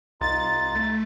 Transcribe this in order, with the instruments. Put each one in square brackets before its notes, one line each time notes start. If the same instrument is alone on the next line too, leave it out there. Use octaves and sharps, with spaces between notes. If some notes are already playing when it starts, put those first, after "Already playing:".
[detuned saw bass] C2 [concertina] D#4 F4 [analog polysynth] A6
[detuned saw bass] A3